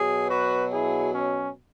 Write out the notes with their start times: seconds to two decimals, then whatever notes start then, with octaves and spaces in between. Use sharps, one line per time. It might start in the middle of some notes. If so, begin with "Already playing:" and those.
Already playing: B2 F#3 G#4
0.29 F#4 B4
0.72 E4 G#4
1.14 C#4